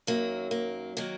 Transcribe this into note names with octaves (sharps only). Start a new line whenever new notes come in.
F#2 D#3 F#3 A#3
A#3
D#3 F#3 A#3